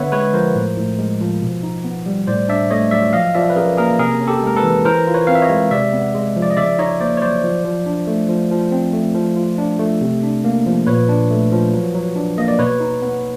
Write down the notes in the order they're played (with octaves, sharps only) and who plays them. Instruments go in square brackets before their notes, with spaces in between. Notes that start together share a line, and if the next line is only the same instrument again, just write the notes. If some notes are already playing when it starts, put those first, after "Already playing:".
Already playing: [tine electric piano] D3 B3 B4 C#5 E5 F#5
G#3 B4 C#5
F3 A#4 C5
A2
A2
G#3
F3
B2
D#4
B3
G3
A2 C5 D5
D4 D5 E5
A3 C#5 D#5
F#3 D5 E5
F3 D#5 F5
F3 D5 E5
B4
C#4 G#4 A#4
A#3 G#4 A#4
C3 G#4 A#4
C#4
G4 A4
G#3 A#4
A4 B4
E3
E3 A#4 C5
F4
B4 C#5
C4 F5
E5
C#5 D#5
G#3
C3 D5 E5
B3
G#3
F3
D5
D#5
C#3 D5 E5
D#4 C#5 D#5
A#3 C5 D5
C#5
F#3 C5 D5
F3
F3
D4
A3
F3
F3
C4
A3
F3
F4
D4
A3
C3
D4
A#3
F3
A#2 B4 C#5
D4
A3
F3
F#3
F#3
D4
A#3 D#5
D5
B2 B4 C#5
D#4
B3